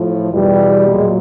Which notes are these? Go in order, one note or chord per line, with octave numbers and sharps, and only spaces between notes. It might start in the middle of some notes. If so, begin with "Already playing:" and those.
Already playing: A2 F3
E2 B2 G3
A#2 F#3 G#3